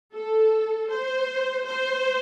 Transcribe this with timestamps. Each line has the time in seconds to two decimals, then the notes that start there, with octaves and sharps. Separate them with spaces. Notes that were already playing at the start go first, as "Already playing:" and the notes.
0.13 A4
0.90 C5
1.66 C5